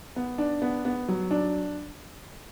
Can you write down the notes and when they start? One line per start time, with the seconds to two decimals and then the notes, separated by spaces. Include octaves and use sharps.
0.16 B3
0.38 D4
0.62 B3
0.85 B3
1.08 F#3
1.31 D4